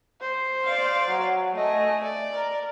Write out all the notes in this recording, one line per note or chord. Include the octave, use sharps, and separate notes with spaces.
C5
D5 F5
F#3
A3 D#5 G#5
D5
A#4